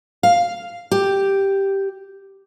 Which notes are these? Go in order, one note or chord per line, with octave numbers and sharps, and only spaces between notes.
F5
G4